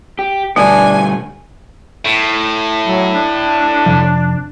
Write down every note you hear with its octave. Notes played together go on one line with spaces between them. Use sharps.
G4
B2 D3 G3 A3 D4 G#5
A2
F#3
D4
F2 C3 F3